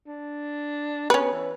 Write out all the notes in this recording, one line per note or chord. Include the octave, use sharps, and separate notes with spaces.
D4
B3 C#4 B4
E3